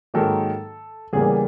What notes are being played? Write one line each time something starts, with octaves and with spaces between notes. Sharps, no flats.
G#2 D#3 F#3 A#3 A4
E2 C#3 E3 G3 A#3 G#4